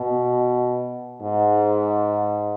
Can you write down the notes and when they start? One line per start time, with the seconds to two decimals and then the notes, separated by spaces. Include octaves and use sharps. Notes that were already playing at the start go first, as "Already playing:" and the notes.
Already playing: B2
1.21 G#2